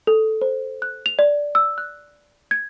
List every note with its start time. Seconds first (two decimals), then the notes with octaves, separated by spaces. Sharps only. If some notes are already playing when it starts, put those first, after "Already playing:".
0.07 A4
0.42 C5
0.82 F#6
1.06 F7
1.19 D5
1.55 E6
1.78 F#6
2.51 G#6